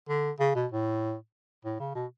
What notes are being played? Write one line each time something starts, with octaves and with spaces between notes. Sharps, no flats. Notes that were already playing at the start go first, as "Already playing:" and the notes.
D3
C#3
B2
A2
A2
C#3
B2